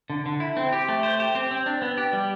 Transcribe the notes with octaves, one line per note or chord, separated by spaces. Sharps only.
D3
D3
E4
C4
G4
A3
C5
G4
C4
C4
D4
B3
G4
G3